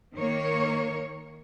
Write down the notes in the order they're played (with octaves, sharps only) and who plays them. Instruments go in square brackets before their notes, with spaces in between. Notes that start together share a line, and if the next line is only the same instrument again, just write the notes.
[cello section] D#3 A#3 A#4 C#5